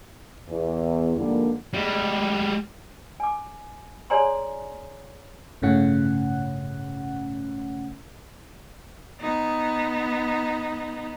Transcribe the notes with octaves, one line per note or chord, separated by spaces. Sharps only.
E2
G#2 D3 F3 G3 A#3
G3 G#3
G#5 D6
G#4 C#5 D5 G#5 A#5 C6
G1 A2 C#3 C#4 F#5
B3 D#4